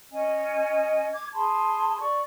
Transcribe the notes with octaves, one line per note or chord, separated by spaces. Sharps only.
C#4 D#5 G#5
D6 G#6
G#4 A5 B5 C6
D5 C#6